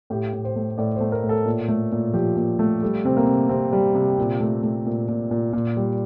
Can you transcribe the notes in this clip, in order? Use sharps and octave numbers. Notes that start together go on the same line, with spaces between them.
A2 G4
A2
C5
A3
A2 D5
A3 C5
A#4
A2
A4
A#2
A3
A#2
F3 G4
A#2
A3
G3 A4
C3 C4
A#3
C3
C3 C4
G3
C3
A#2
A3
A3
A#2
A#2
A#2
A#2
G3